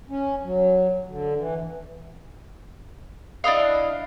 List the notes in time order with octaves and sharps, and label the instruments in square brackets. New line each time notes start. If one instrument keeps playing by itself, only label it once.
[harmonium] C#4
F#3
D3
E3
[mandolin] D4 E4 D#5 F5